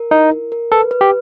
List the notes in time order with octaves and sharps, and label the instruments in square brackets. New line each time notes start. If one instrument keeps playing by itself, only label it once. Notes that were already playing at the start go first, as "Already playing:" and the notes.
Already playing: [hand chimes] A#4
[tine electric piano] D#4 [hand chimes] E4
[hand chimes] A#4
A#4
[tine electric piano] A4 [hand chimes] B4
[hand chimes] B4
[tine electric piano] G4